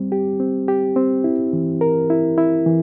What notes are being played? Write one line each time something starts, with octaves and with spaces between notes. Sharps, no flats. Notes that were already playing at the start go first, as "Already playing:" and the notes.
Already playing: G3 C4
G4
C4
G4
C4
E4
E3
A#4
E4
E4
E3